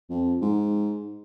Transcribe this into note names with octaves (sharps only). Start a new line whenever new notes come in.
F2
G#2